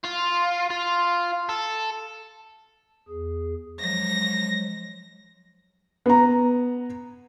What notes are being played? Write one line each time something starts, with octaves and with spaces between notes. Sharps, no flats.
F4
F4
A4
E2 G#4
F3 F#3 G#3 A#6
B3 A#5